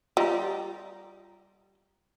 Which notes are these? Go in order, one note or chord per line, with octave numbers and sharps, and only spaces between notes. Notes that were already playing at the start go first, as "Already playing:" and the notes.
G3 F4 D#5 A#5